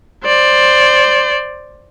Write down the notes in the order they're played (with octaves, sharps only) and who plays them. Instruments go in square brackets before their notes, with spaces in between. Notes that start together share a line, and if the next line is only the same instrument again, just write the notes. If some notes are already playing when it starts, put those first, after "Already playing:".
[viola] C5 D5